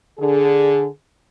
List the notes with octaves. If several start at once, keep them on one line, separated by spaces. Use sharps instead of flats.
D3 G#4